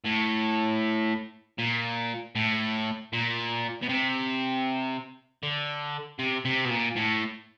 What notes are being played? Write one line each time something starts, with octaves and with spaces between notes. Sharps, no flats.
A2
A#2
A2
A#2
B2
C3
D3
C3
C3
B2
A#2
A2